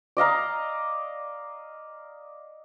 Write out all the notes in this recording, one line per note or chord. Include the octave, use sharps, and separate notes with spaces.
D5 D#5 F5 A#5